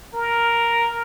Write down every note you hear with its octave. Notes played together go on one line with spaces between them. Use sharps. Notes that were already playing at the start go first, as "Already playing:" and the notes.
A#4